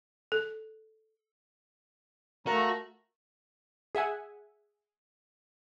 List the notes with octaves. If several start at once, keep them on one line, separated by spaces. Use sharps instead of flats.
A4
A3 F#4 A#4 F5 A5 A#5
G#4 E5 F#5 G#5